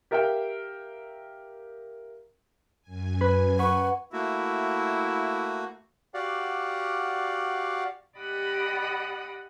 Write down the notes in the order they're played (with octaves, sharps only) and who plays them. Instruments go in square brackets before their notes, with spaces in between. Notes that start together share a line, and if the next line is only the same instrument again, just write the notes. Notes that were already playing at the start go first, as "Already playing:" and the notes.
[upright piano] G4 A#4 E5 F5 G5
[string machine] F#2 G#5
[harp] B4
[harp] B4 C#6 [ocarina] F#5
[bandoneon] A3 A#3 F#4 [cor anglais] E4
[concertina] F#4 G4 D5 F5 F#5
[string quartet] G4 D5 D#5 F#5 B5 D#6